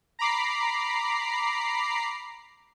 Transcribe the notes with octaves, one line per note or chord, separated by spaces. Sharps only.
A#5 B5 D6 C7